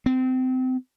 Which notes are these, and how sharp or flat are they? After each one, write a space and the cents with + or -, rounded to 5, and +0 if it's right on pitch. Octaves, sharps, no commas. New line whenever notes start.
C4 -25